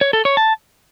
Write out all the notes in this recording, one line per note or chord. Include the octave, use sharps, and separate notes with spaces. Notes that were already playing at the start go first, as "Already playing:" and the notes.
C#5
A4
C#5
A5